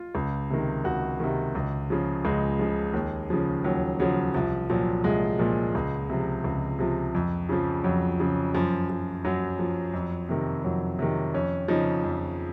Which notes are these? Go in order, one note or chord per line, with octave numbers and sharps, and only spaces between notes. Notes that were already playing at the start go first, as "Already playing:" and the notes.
Already playing: F4
C#2
C3 D#3
C#2 F#4
C3 D#3
C#2
C#3 F3
C#2 G#3
C#3 F3
D#2
C#3 F3
D#2 F#3
C#3 F3 F#3
C2 F3
A#2 F3 F#3
C2 G#3
A#2 F3
C#2
C3 F3
C#2
C3 F3
F2
C#3 F3
F2 F#3
C#3 F3
F#2 F3
F3
F#2 F#3
F3
F2
C3 D#3
F2 F#3
C3 D#3
F2 C#4
C#3 F3 D#4
F2